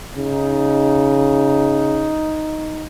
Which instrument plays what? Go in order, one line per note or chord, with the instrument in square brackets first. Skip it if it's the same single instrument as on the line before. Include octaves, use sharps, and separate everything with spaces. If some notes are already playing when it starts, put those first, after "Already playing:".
[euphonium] C#3 [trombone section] D#4